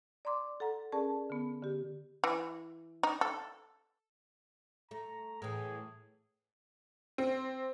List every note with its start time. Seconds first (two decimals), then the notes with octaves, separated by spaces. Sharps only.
0.25 D5 A#5 C6 D6
0.60 A4 F#5 A#5
0.92 C#4 G#4 A#4 D5 A5
1.30 D3 B3
1.63 D3 G4
2.24 E3
3.03 D#4
3.21 A4
4.91 A3 A#5
5.42 A2 E3 G#4
7.18 C4